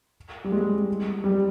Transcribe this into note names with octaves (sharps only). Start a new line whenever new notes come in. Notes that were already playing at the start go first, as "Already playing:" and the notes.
G3
G#3
G3